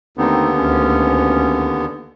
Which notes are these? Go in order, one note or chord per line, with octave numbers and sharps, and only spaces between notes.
D#2 D3 A3 B3 C4 D#4
D2 C#4